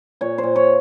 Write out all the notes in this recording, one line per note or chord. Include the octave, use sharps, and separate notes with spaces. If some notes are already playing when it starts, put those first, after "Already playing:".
A#2 C#5
C5
A#2
C#5